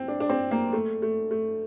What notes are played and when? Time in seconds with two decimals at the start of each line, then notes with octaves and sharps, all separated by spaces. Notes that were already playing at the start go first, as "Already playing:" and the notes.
Already playing: C4
0.08 D4
0.20 D4
0.29 C4
0.51 A#3
0.73 A3
1.02 A3
1.31 A3